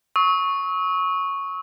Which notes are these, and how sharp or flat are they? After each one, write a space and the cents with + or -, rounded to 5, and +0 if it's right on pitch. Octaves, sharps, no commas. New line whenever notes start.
C#6 +0 E6 -45